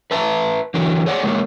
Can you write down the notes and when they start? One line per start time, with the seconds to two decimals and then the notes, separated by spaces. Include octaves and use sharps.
0.11 B4 E5 A5 A#5
0.74 D3 E3 F#3 A#4
1.06 G#4 C#5 D5 F#5
1.23 G#3 A#3 G4 A#4 C#5